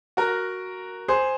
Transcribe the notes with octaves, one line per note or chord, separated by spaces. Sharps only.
F#4 A#4
G#4 C5